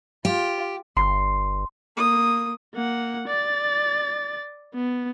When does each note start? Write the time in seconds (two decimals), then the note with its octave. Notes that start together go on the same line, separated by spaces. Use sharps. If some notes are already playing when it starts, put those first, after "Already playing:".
0.25 F4 G4
0.97 G1 C6
1.96 A#3 D#6
2.74 A#3 F#5
3.28 D5 A6
4.74 B3